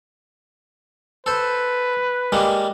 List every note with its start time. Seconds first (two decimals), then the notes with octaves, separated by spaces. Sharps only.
1.26 A4 B4 C5
2.32 G3 G#3 A#3